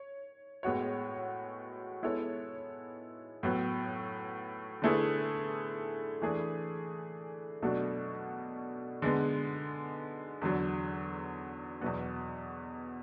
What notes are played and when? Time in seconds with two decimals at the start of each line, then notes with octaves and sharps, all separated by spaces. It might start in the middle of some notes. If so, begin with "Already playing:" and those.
Already playing: C#5
0.63 A2 G#3 B3 F#4 C#5
2.02 G#3 B3 E4 A4 C#5
3.43 A2 F#3 B3
4.82 D3 A3 E4 G#4 B4
6.22 E3 A3 D4 G#4
7.62 B2 F#3 A3 D4 F#4
9.02 D3 G#3 B3
10.41 E2 D3 F#3
11.81 E2 B2 F#3 B3